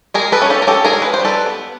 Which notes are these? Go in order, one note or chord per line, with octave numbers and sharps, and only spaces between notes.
G#3 G#4 A#4
A4 B4
C#4 G#4
G4 A4
A#4
C#4 G4 A4
G#4 A#4
G#3
B4
C5
G3
A4 B4
B3